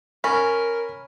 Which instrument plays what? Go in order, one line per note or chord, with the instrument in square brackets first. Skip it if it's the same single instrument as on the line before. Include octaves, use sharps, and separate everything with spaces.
[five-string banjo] C#4 [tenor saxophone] A#4 [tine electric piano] B5